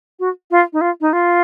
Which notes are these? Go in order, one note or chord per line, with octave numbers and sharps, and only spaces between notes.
F#4
F4
D#4
F4
D#4
F4